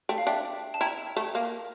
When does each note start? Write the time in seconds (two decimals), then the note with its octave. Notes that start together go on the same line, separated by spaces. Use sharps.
0.09 A3 G5
0.18 F5
0.27 D4 E5 G5
0.74 A5
0.81 E4 G5 A#5
1.17 A3
1.35 A#3